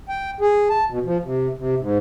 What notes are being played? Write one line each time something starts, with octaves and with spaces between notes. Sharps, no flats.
G5
G#4
A5
B2
F3
C3
C3
G#2